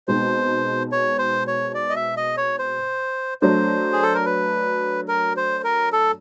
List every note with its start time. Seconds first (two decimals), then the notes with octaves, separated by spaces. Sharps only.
0.08 B2 G#3 C4 D#4 C5
0.92 C#5
1.19 C5
1.47 C#5
1.74 D5
1.90 D#5
1.96 E5
2.17 D#5
2.37 C#5
2.59 C5
3.42 F#3 A3 D4 C5
3.93 G#4
4.03 A4
4.14 A#4
4.25 B4
5.08 A#4
5.37 C5
5.64 A#4
5.93 A4